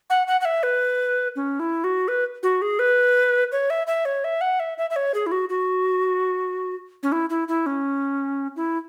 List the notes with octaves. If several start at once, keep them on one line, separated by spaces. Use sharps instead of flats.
F#5
F#5
F#5
E5
B4
C#4
E4
F#4
B4
F#4
G#4
B4
C#5
E5
E5
C#5
E5
F#5
E5
E5
E5
C#5
G#4
E4
F#4
F#4
C#4
E4
E4
E4
C#4
E4